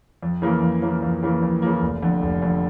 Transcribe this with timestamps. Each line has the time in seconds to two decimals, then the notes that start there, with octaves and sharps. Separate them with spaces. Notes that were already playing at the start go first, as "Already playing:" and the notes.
0.23 F2
0.42 C#3 E3 A#3
0.62 F2
0.82 C#3 E3 A#3
1.03 F2
1.23 C#3 E3 A#3
1.42 F2
1.62 C#3 E3 A#3
1.82 F1
2.02 F2 D3
2.22 F1
2.42 F2 D3